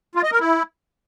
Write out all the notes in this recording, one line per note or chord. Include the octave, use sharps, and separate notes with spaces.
F4
D#5
A#4
E4